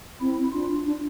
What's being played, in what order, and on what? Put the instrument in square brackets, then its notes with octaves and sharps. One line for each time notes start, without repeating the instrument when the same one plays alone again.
[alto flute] C4 [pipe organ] E4
[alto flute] D4 [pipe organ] F4
[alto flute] D4